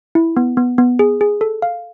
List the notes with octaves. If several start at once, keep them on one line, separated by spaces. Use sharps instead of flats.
E4
B3
B3
B3
G#4
G#4
A4
F5